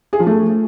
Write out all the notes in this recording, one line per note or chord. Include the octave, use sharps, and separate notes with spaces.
G#4
F3
A3